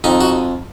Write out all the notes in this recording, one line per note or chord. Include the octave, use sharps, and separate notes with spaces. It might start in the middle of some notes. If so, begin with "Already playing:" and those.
F2 D#4
F#4